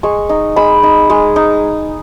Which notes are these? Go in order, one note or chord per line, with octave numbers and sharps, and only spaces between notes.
G#3 C#6
D#4
G#3 B5
D#4
G#3
D#4